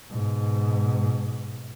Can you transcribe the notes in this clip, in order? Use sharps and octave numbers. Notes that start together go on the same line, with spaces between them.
G#2 B2